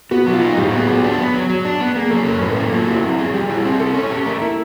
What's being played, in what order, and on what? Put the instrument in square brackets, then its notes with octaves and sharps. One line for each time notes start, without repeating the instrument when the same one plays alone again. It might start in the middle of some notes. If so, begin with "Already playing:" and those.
[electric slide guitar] B3 [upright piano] F#4
[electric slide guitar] F#3
[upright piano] F4
[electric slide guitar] D#4
[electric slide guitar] A2 [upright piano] G4
[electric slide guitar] B3
[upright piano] G#4
[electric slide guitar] F#3
D4
B3
F#3
F#3
D4
B3
[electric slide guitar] A#3 [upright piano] G#4
[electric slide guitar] F#3 [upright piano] A4
[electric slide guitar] C#4 [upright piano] A#4
[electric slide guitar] A2 [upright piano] B4
[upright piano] A4
[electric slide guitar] A#3 [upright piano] A#4
[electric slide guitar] F#3 [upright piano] F4
[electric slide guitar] E4 [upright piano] F#4
[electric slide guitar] C4
G#4
[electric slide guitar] G3 [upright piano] G4
[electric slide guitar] E4
[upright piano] G#4
[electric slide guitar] C4
[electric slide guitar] E4 [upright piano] A4
[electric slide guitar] C#4
G4
[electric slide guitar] A3 [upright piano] A#4
[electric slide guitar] E4 [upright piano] A#4